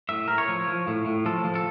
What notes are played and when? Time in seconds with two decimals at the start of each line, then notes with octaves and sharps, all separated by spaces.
0.09 A2 E5
0.28 A2 A#4
0.38 C#5
0.48 F3
0.68 F3
0.87 A2
1.06 A2
1.26 F3 A4
1.45 F3
1.55 A4